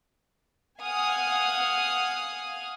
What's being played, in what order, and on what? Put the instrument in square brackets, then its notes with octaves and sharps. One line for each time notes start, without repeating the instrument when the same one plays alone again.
[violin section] F5 F#5 G#5 D#6 F6